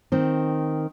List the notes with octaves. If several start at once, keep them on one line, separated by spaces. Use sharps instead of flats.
D#3 C4